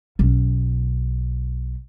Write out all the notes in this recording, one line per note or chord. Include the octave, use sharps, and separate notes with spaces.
B1 C#4